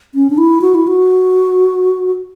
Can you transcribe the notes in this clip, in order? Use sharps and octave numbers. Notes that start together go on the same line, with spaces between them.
C#4
D4
E4
F#4
E4
F#4